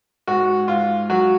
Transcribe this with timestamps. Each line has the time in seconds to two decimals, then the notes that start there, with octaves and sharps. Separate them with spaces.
0.27 G#2 F#4
0.68 G#2 F4
1.10 F#3 F#4